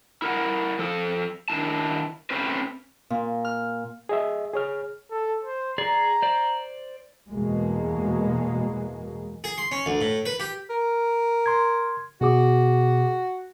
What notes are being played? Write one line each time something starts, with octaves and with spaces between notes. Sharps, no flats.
E4 A#4 F#5
F3 A4
D#3 D4 E4 A5
A3 C4 C#4 B4 C5
A#2
F6
G#4 D#5 E5
G#4 C#5 F6
A4
C5
G#4 D5 A#5
C5 D5
E2 B2 G#3 A#3
G#4
C6
C#4
D2
A2
B4
G4
A#4
C6 G#6
B2 F#4 G#4 D6